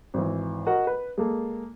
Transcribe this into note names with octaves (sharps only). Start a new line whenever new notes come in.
G#1 E3
F#4 A#4 D#5 F#5
B4
G#3 A#3 A4